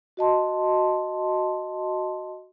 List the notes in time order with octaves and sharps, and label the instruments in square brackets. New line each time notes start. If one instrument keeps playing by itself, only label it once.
[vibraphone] F#4 D#5 A5 C6